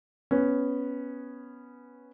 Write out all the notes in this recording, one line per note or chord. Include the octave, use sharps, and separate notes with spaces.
B3 C#4